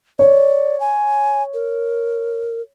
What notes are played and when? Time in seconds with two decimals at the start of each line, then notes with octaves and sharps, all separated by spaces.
0.19 C#5 D5
0.80 G#5
1.54 A#4